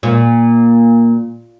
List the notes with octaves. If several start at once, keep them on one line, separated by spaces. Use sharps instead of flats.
A#2